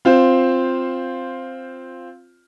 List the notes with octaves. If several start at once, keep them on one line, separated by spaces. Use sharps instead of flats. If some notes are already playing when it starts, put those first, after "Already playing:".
C4 F4 C5